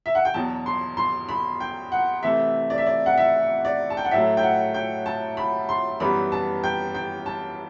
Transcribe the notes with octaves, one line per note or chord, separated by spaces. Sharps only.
E5
F#5
G5
E2 B2 F#3 A5
C6
C6
B5
G5
F#5
C3 E3 A3 E5
D5
E5
D5
F#5
E5
D5
A5
G5
F#5
A2 F#3 A3 E5
G5
F#5
G5
A5
B5
C6
F#2 E3 G3 B3 B5
A5
G5
G5
A5